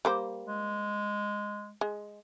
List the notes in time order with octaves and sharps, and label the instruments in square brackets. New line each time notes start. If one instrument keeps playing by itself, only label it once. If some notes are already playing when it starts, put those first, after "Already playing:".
[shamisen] G3 A#3 C5
[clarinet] G#3
[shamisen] G#3